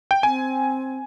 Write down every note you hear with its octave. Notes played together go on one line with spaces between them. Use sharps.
G5
C4 G#5